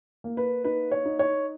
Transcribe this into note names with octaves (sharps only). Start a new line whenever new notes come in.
A#3
B4
D#4 B4
C#5
D#4
C#5